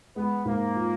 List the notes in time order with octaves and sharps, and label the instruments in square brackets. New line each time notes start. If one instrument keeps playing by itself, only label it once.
[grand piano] G#3 [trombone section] B3
[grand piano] G#2 [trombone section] A#3
[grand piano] F4